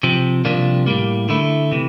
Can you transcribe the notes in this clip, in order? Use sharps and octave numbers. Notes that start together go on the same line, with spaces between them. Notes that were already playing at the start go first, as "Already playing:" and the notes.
C3 F3 C4
C2 C3 F3 A#3 D4
A2 G3 A#3
D3 A3 E4
C3 E3